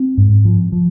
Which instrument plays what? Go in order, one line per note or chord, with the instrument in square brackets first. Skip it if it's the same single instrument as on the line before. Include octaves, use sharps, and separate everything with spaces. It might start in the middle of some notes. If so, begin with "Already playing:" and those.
Already playing: [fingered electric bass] C4
G#2
F3
F3